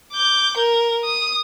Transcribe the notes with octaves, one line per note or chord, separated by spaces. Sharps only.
D6 G6
A#4
D#6